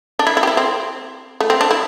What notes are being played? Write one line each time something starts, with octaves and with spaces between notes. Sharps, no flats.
D4
E4
E4
G4
E4
C4
A3
C4
D4
E4